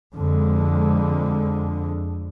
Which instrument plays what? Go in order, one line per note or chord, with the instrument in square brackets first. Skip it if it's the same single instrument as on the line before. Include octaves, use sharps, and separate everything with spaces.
[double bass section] F2 D3 G#3